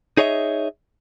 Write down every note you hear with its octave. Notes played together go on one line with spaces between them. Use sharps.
D#4 G#4 C#5 D#5 E5